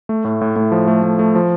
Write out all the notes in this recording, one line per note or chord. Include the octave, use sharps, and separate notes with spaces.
A3
A2
A2
A2
F3
A3
A3
A3
F3